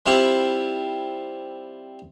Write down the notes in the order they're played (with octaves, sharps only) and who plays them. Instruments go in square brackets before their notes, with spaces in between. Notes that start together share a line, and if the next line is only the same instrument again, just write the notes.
[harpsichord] G3 C4 E4 F4 G4